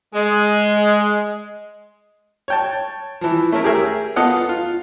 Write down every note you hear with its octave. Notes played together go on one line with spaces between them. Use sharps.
G#3
C#5 G5 A5
E3 F3
A3 C#4 E4 A#4
G4 G#4 A#4 E5
B3 F4 A4 D#5 F#5
F4